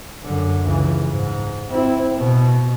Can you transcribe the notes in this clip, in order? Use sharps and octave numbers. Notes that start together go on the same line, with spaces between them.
F#2 D3
C#2 E3
G#2
C4 E4
B2